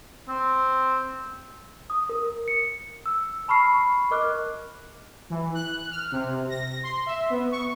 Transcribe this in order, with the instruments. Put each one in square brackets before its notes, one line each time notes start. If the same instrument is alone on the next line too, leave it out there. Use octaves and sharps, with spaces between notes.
[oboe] C4
[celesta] D#6
A#4
C#7
E6
A5 B5 C#6 F6 C7
A#4 D#5 D6 F6 F#6
[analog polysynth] E3
F#6
F6
C3
A#6
C6
E5
B3
C#6